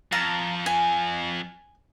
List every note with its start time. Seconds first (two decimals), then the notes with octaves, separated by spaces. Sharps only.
0.12 F2 F5 A5 A#5
0.66 G#5